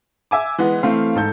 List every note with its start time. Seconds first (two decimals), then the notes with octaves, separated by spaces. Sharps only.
0.31 E5 G#5 D6
0.58 E3 G#3 B3
0.83 E3 A3 C4 F5
1.15 G#2 A4 G6